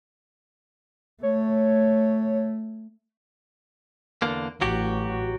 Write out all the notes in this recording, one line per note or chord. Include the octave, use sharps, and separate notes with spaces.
A3 C#5
E2 D3 A#3
A1 F#3 F#4 G4